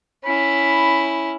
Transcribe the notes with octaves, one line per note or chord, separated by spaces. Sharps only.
C#4 E4 B5